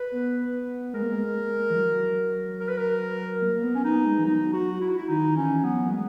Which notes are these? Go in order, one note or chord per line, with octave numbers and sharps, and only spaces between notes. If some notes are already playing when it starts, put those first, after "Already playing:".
Already playing: B4
B3
G#3 A#4
A#3
G#3
E3
F#3
A#4
B4
A#4
A#3
A#3
B3
C#4
B3 D#4
G#3
E3
F#3 D#4
F#4
E4
F#4
E4
D#3 D#4
E3 C#4
F#3 B3
A#3
G#3 B3